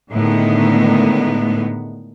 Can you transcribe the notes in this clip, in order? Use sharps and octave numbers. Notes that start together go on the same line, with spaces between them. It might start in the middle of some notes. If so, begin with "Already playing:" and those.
A2 D3 D#3 G#3 B3